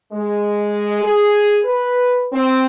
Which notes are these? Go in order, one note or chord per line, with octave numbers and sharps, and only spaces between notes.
G#3
G#4
B4
C4